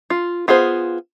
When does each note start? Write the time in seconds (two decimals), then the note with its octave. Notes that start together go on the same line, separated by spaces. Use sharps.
0.10 F4
0.48 B3 F4 G#4 C5